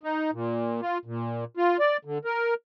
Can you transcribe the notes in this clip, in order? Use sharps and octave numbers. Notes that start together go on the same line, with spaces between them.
D#4
A#2
F4
A#2
F4
D5
D3
A#4